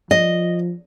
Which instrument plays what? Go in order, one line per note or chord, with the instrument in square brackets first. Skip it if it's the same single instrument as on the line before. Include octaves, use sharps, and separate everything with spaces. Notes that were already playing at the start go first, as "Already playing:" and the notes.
[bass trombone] F3 [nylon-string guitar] D#5